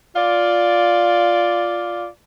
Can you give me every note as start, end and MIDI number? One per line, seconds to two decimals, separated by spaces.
0.16 2.08 65
0.16 2.08 74